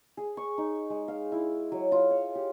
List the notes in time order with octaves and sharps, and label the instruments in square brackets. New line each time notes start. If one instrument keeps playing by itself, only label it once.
[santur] G#4
C#6
D#4
G#3
F5
E4
F#3
F4
C#5
G4